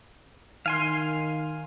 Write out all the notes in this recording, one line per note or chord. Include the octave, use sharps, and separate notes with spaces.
D#3 F5 G#5 C6